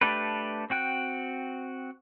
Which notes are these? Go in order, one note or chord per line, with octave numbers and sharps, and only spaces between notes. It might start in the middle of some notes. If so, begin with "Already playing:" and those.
A3 D4 G4 A4 B4
C4 F#4 G5 F#6